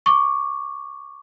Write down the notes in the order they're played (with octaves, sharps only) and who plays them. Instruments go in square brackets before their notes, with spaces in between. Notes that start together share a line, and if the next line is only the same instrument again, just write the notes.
[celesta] C#6 D6